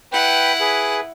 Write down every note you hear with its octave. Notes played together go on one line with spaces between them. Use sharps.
E4 B4 F#5 G5
G#4 B4